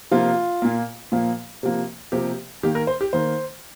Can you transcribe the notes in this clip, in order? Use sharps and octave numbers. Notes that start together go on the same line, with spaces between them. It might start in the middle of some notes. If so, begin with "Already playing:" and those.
C3 F3 A#3 F4
A#2 A#3
A#2 F3 A#3
C3 F3 A#3
C3 F3 A#3 G4
D#3 A#3 G4
A#4
C5
G4
D#3 A#3 C5